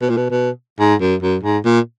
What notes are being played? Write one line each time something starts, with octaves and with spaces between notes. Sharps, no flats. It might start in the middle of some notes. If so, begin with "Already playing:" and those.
B2
A#2
B2
B2
G#2
F#2
F#2
G#2
A#2